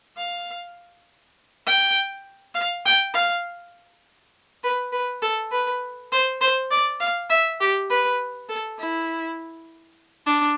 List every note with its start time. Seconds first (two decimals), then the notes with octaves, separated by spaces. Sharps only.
0.17 F5
1.67 G5
2.55 F5
2.86 G5
3.14 F5
4.64 B4
4.92 B4
5.22 A4
5.51 B4
6.12 C5
6.41 C5
6.71 D5
7.00 F5
7.30 E5
7.60 G4
7.90 B4
8.49 A4
8.79 E4
10.26 D4